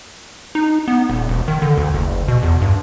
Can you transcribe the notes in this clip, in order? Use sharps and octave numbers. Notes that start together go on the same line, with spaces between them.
D#4
B3
D#1
E1
D#3
D3
D2
F#1
B2
E2
G2